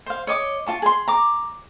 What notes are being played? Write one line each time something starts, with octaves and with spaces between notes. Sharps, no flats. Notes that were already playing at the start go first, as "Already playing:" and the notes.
C5 F5
C#5 D#5 D6
F4 A5 C#6
G#4 C6
A#5 D6